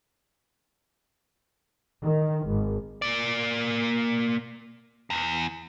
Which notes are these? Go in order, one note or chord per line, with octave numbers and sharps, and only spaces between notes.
D#3
G#1
A#3 D5
E2